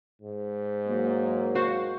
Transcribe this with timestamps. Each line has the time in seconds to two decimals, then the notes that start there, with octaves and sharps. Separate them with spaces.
0.22 G#2
0.87 F#3 A#3
1.55 F#4 C5 F5